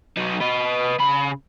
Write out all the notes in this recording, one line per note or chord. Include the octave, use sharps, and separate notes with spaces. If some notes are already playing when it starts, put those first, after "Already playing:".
F#3 D#4
B4 D#5
C#3 B5